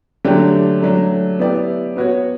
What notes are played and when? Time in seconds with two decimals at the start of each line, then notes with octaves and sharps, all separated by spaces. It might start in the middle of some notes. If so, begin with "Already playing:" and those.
0.25 D3 F#3 A3 D4 G4
0.82 F#3 A3 D4
1.39 B3 E4 G4 D5
1.96 B3 F#4 C#5